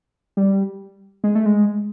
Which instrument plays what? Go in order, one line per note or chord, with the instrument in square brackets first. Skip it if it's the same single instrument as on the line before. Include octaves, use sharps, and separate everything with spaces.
[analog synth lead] G3
G#3
A3
G#3